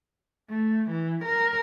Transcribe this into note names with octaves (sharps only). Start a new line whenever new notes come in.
A3
E3
A#4